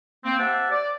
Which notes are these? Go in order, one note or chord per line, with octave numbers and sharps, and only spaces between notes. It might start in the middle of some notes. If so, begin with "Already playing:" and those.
A#3 C4
G4 C5 E5 F#5 A5
D5